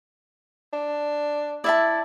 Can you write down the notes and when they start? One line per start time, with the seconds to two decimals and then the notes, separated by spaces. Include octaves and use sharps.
0.73 D4
1.64 E4 D5 E5 A5